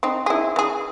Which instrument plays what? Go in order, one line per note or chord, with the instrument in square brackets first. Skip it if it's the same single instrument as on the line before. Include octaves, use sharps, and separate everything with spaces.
[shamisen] C4 D#4
E4 G#4
E3 G#4